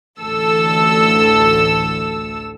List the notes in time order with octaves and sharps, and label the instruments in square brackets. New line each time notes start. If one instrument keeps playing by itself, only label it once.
[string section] A1 D2 A4 E6